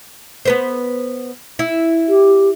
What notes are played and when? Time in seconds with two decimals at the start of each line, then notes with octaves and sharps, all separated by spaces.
0.45 B3 B4 C5
1.59 E4
2.09 G4